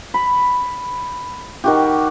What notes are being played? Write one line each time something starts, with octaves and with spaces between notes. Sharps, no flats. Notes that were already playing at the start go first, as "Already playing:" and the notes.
B5
D#3 F#4 G4